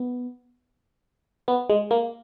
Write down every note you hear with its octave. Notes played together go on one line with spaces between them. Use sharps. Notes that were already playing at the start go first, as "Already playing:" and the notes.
Already playing: B3
B3
G#3
A#3